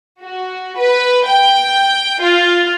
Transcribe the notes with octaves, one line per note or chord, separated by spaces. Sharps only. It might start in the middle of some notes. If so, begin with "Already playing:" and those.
F#4
B4
G5
F4